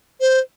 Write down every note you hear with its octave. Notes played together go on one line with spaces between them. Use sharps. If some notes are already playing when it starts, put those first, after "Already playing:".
C5